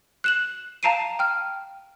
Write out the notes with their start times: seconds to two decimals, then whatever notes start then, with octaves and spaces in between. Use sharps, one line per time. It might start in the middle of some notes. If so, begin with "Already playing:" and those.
0.24 F#6 E7 F#7
0.83 F5 A5 A#5 C7 D7 D#7
1.19 G5 F6